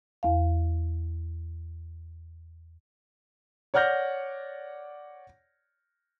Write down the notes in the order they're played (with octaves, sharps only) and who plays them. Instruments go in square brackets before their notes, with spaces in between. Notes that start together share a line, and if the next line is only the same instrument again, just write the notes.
[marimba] E2 F5
[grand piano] C#5 D5 F#5 F6 G6 A#6